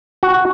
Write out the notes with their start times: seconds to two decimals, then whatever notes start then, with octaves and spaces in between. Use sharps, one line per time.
0.23 F#4